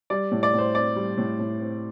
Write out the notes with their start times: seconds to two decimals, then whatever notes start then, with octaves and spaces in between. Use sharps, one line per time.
0.10 G3 D5
0.32 A2
0.43 D5
0.53 A2
0.59 C5
0.75 C4 D5
0.96 G3
1.18 A2
1.39 A2
1.61 C4